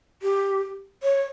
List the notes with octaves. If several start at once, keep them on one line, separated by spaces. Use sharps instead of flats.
G4
C#5